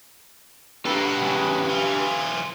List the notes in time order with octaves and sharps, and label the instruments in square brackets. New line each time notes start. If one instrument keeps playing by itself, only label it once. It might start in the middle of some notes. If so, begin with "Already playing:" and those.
[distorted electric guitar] A#3 A4 [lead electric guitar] G4 B4
[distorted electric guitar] B2 F#5
E2 C#3
E3 F4